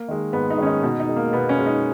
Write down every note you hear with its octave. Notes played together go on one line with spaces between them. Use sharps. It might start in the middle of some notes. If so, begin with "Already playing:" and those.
Already playing: A#3
D#3 G#3
G#2 B3
D#4
D#3 G#3 C#4
D#4
B2 D#4
D#4
G#3
A#3
B2 B3
C#4
G#3
D#4